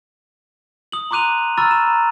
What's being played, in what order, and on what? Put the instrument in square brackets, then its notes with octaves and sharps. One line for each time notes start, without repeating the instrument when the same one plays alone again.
[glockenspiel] D#6 F#7
A#5 C6 D6 F#6 D#7 F7
A#5 B5 C#6 E6 F6 A6
E7
A#5